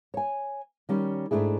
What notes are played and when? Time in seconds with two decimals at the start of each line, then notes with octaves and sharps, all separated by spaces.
0.14 C#5 G#5
0.89 D#3 G3 C#4
1.31 G#2 A3 D4 E4 G#4